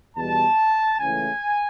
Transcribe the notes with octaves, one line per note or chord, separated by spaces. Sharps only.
E2 B2 G3 A5
C#2 C#3 E3 A3 G#5